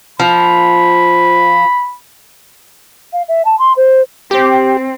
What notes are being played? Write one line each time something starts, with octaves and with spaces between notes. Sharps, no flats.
F3 B5
F5
E5
A5
C6
C5
C4 G4